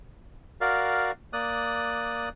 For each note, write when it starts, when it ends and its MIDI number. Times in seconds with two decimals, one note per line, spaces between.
0.61 1.11 66
0.61 1.11 70
0.61 1.11 74
0.61 1.11 77
1.33 2.29 58
1.33 2.29 74
1.33 2.29 87
1.33 2.29 90